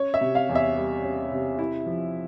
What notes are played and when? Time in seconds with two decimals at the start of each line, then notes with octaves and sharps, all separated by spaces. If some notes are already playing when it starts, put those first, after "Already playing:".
Already playing: C#4 C#5
0.14 E5
0.21 C3
0.35 F5
0.49 E2
0.55 E5
0.76 G3
1.03 C#4
1.32 C3
1.59 E4
1.86 F3